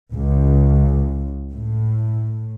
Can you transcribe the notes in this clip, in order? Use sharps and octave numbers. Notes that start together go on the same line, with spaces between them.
C#2
A2